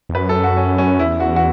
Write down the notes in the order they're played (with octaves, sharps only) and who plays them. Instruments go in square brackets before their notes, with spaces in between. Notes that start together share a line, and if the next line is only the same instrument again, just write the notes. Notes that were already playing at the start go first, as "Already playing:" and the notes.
[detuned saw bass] E2
[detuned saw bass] F#2 [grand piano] B4
[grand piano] A4
F#4
C#4
C#4
[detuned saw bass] E2 [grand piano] E4
[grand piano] F#4
F#4